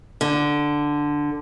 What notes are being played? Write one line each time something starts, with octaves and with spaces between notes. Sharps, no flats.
D3